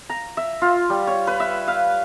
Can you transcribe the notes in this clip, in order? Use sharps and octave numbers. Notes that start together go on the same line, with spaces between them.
A#5
E5
F4
G3
C#5
B4
E5
F5